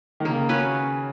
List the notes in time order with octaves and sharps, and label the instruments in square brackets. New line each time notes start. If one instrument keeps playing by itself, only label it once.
[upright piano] D#3
[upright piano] C#3 [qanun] A#3
[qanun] C#4 F#4 B4